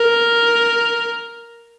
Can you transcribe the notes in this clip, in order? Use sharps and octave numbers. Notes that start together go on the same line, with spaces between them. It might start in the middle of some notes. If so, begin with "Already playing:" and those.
Already playing: A#4